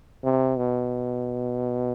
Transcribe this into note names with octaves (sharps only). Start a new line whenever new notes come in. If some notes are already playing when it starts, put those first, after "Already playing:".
C3
B2